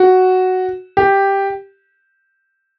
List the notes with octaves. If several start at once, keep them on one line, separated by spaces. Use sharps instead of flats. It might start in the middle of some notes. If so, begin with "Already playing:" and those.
Already playing: F#4
G4